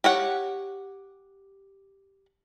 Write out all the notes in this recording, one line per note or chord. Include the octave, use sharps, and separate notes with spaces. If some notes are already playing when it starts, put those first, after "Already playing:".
G4 C#5 F#5